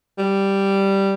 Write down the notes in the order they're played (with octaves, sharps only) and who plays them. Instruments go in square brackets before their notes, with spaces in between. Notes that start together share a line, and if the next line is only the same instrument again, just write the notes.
[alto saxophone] G3